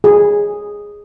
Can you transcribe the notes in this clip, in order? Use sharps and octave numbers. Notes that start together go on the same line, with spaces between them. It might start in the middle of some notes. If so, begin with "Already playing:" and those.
G#4